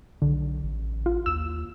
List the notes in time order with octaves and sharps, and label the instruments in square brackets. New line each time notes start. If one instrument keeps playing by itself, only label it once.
[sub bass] B1 [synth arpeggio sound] D3
[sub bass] A1
[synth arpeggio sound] F4
[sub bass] D#2 [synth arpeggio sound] E6 E7